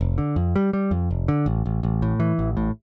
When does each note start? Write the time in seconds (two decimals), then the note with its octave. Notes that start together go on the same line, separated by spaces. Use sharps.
0.01 F1
0.18 D3
0.36 F2
0.56 G3
0.73 G3
0.91 F2
1.11 F1
1.28 D3
1.46 A1
1.66 A1
1.83 A1
2.02 A2
2.20 E3
2.39 A1
2.57 A2